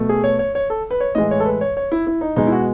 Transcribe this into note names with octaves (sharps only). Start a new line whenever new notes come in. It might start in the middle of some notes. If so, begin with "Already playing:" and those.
Already playing: B2 A3
G#4
C#5
C#5
C#5
A4
B4
C#5
A2 E3 G#3 D#5
C#5
A4
B4
C#5
C#5
E4
E4
D#4
B2 G#3 D#4
E4
F#4